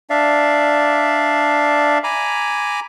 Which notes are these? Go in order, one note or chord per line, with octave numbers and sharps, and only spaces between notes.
D4 D5 E5 F5
G#5 A#5 B5 D6